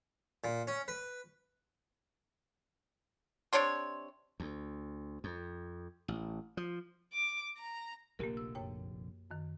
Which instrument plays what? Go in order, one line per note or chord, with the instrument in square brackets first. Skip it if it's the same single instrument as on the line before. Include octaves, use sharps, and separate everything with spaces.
[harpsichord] A#2
C#4
B4
[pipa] C3 D4 C#5 C6
[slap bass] D2
F2
A1
F3
[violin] D6
A#5
[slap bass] F1 A#1 D3 [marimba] A#3 G4 A#4
[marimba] E6
F#2 C#5 G5
F#2 D#3